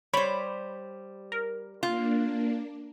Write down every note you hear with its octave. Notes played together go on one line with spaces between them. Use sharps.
G3 C5 C#5 B5
A#4
A#3 D4 F4